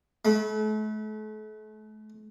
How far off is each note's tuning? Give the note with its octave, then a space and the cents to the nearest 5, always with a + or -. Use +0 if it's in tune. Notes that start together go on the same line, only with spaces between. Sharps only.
A3 -40 B5 -25